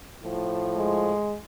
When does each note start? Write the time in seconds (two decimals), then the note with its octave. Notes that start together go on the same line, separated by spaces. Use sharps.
0.21 A2 F3
0.77 G#3